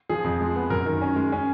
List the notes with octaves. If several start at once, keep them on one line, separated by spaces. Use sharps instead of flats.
F3 G#4
F2
G#3
B3
F#2 A#4
D#3
C#4
G#3
C#4